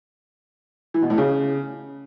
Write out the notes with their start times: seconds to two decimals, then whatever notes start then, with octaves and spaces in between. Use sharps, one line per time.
0.94 E3
1.02 B2
1.10 A2
1.18 C#3